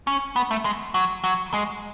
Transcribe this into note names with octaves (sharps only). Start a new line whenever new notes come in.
C#4
B3
A3
G#3
F#3
F#3
G#3